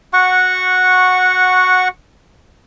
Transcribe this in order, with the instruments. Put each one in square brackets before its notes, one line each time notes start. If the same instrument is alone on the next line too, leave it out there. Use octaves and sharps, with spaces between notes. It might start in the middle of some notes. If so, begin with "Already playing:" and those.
[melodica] F#4 F#5 C#6